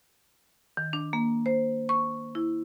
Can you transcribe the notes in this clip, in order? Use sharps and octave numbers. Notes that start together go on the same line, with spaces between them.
D#3
D4
A#3
C5
C#6
E4